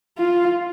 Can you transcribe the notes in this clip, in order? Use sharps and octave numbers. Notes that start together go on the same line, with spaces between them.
F4